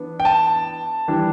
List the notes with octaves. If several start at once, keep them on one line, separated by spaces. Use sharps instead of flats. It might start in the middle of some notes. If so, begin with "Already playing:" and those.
Already playing: E3 B3 D4
G5
A5
E3 G3 D4